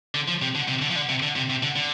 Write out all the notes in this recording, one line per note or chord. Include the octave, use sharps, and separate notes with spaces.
D3
F3
C3
D3
C3
D3
F3
D3
C3
D3
C3
C3
D3
D3